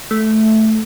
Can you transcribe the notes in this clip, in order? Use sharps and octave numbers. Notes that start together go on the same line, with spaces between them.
A3